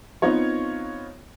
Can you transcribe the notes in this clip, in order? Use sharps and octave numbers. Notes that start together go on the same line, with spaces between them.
B3 C4 D#4 F4 C#5